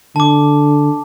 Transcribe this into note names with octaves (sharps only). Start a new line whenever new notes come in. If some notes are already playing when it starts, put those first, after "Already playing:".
D3 A5 D6